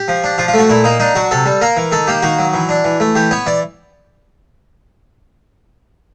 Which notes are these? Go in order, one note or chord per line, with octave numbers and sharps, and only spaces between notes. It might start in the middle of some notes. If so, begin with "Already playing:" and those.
Already playing: G4
F3
D4
F3 F4
F4
A3 F#4
A#2 E4
A#3 D#4
D4 D#4
F#3 F#4
C3 A4
G3
A#3 A#4
E3
D#3 A4
A#3 G4
D#3 F#4
F#3
E3
D4
E3
A3
E3 G4
B3 C#5
E3 D5